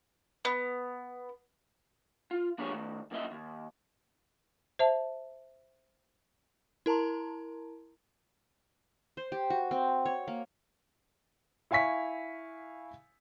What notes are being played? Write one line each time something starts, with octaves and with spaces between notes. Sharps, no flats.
B3
F4
F3 A#3 D4 G4 G#4 C#5
D#3 A3
F#2 A#3 D#5 E5
D#2
C5 E5 A5
E4 A#4 A5 A#5 C6
C5
G4
F#4
C4
C#5
A#3
E4 F5 G#5 C#6 B6